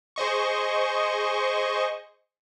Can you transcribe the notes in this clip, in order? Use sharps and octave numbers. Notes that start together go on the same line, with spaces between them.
G#4 C5 D#5 C#6